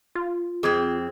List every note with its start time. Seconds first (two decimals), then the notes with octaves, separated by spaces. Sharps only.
0.15 F4
0.63 F2 C4 G#4 D6 G#6